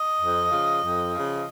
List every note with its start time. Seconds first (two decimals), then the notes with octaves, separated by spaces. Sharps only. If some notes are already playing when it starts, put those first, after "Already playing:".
Already playing: D#5
0.20 F2
0.51 C#3 F3
0.82 F2
1.13 C#3 F3